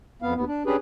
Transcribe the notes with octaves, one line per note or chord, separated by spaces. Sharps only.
F2 B3 F5
D#2 B3
D4
C#4 D4 G4 G#4 B4